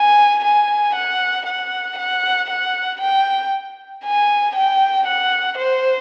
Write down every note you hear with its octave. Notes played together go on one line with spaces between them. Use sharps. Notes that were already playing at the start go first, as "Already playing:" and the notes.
Already playing: G#5
G#5
F#5
F#5
F#5
F#5
G5
G#5
G5
F#5
C5